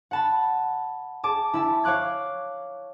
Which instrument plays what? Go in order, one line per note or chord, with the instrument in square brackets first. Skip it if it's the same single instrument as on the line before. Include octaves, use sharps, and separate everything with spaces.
[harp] F#5 A5 B5
G#4 A5 D6
E4 E5 A5
C#5 F5 D6 F#6 G#6